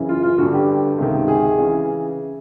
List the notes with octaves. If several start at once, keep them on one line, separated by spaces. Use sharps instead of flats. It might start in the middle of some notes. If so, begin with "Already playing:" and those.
Already playing: F#2 C#3 E3
F4
F4
G2 D3 F#4
G4
C#2 C3 D#3
G#4
C#3 E3